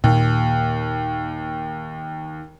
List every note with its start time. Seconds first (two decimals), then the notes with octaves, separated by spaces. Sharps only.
0.04 D#2 A#2